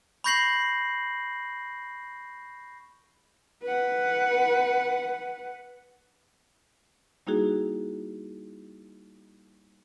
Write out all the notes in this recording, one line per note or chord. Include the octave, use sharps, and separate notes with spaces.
B5 C#6 G6 A#6 C7 F#7
B4 F#5
G3 A#3 D#4 E4 F#4 G#4